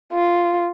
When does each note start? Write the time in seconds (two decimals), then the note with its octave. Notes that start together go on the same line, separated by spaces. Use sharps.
0.13 F4